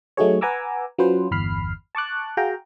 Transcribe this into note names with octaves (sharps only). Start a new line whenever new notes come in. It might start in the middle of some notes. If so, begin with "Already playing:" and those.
F#3 A3 D#4 F#4 G#4 C#5
B4 F#5 G#5 A#5 D6 E6
F#3 C#4 F4 B4 C5
G1 E2 B5 F6 C7
A5 C#6 D6 F#6
F#4 G#4 F5 G5 A#5